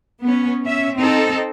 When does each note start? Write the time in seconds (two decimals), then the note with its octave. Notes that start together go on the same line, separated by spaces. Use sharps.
0.23 B3 C#4
0.65 C#4 E5
0.97 C4 D#4 A4